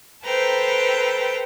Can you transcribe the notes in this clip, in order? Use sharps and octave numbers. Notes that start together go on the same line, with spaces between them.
A4 B4 C5 G5 A#5